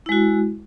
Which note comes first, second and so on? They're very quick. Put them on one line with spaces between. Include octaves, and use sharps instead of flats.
E4 G#3 F#4